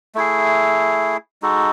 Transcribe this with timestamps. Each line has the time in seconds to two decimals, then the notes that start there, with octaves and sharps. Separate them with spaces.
0.15 A3 E4 G#4
1.42 G#3 D#4 F#4 A4